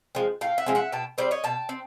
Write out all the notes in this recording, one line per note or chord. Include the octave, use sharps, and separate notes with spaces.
F3 G#3 C4
A2 F5 G5
E5 F#5
F3 G#3 C4
E5 F#5
B2 G5 A5
G3 C4 C5 D5
C#5 D#5
B2 G5 A5
C4